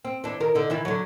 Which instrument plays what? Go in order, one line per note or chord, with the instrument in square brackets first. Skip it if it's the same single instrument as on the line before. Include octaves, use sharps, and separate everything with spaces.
[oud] C4
E3 D4
D#3 A#4
D3 D#4
D#3 E3 E4
D3 F#3